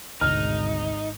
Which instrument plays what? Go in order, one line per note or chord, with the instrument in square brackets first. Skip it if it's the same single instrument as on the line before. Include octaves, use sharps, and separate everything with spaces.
[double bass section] G#1 [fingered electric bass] D2 B2 D3 [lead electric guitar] D#4 [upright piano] F6